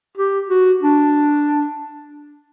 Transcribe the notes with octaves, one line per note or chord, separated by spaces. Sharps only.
G4
F#4
D4